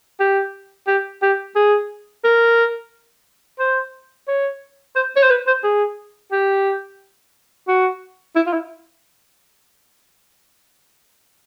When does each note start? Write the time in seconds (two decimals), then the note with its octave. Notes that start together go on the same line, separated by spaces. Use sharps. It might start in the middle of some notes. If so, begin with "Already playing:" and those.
0.20 G4
0.87 G4
1.22 G4
1.55 G#4
2.24 A#4
3.59 C5
4.28 C#5
4.96 C5
5.16 C#5
5.23 C5
5.30 B4
5.47 C5
5.63 G#4
6.32 G4
7.68 F#4
8.36 E4
8.47 F4
8.53 E4